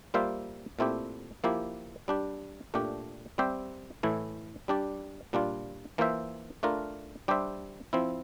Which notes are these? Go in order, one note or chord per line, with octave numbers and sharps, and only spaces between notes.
G3 A#3 F4 C5 E5
A#2 A3 C4 E4 G4
F3 A#3 E4 G4
G3 D4 G4
A#2 A3 D4 G4
G3 C4 G4 C5 E5
A2 E3 A3 E4
G3 D4 G4 D5
A#2 G3 D4 F4
E3 A#3 F4 C5 E5
A3 D4 F4 A#4
G3 D4 G4 C5 E5
F3 C4 E4